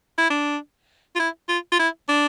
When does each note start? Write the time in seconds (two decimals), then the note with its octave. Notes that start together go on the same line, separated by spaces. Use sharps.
0.18 E4
0.30 D4
1.16 F4
1.19 E4
1.49 F4
1.72 F4
1.79 E4
2.09 D4